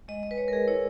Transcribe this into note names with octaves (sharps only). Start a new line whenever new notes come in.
G#3 D#5
G#3 D#5
B4
G#3 C#5
A#4
G#3 G#4
E4 C#5